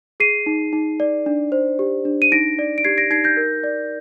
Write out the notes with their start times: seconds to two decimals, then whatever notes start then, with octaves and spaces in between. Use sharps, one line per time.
0.20 G#4 C7 D#7
0.46 D#4
0.73 D#4
1.00 D5
1.26 D4
1.52 C5
1.79 G4
2.05 D4
2.22 D#7
2.32 D#4 A#6 D7
2.59 D5
2.78 D7
2.84 G4 G#6 C7
2.98 A#6 D7
3.11 D#4 G#6 C7
3.24 G6 A#6
3.37 A#4
3.64 D5